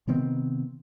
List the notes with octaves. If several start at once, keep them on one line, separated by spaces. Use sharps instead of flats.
C3 D#3 B3 C4